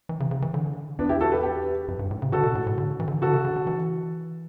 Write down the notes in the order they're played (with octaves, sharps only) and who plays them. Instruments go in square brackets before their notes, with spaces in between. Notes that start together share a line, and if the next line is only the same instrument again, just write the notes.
[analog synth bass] E3
C#3
C#3
E3
D3
[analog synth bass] E2 [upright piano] B3 D4
[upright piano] E4 G4
F#4 A4
G4 B4
G4 B4
[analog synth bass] F#2
G2
A2
C#3
[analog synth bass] D3 [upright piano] F#4 A4
[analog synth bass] B2
A2
A2
D3
E3
D3
[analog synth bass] D3 [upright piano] F#4 A4
[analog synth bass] C#3
D3
D3
E3